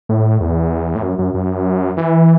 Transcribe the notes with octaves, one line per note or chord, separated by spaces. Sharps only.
A2
E2
A2
F#2
F#2
F#2
E3